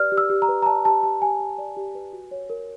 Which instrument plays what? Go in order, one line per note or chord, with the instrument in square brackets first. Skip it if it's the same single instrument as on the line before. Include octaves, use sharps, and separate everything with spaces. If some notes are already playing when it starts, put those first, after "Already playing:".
Already playing: [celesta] G4 B4 D5 F6
G4
E6
G4
A#5
B4
A#5
D5 A5
G4 A5
G4 A5
G4 G#5
G4
D5
G4
B4
F#4
C#5
A#4